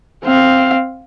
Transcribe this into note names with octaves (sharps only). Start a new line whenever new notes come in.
C4 F5